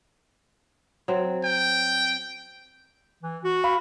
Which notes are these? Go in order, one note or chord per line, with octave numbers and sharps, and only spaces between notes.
F#3 C4
G5
E3
F#4
F5 B5